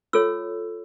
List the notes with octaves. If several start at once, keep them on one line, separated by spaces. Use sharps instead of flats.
F4 A4 C#5 E6